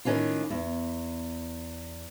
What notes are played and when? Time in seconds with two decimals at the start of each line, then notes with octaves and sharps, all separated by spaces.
0.05 A2 D#3 C#4 D4 F4
0.50 E2